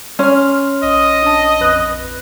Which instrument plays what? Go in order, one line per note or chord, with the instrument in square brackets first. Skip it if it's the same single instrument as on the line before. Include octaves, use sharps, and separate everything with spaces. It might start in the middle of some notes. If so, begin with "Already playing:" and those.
[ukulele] C#4 [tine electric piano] C6 F6
[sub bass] A#1 [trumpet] D#5
[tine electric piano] D4 A5
F2 B4 F#6